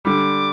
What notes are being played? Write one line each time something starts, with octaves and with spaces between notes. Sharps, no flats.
D3 G3 D6